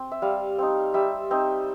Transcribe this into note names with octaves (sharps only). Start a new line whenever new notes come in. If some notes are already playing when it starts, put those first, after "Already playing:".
Already playing: C4
E5
G3 F5
C4 D#4
G3 E5
C4 D#4